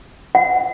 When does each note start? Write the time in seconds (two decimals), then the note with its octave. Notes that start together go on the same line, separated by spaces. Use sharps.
0.35 F#5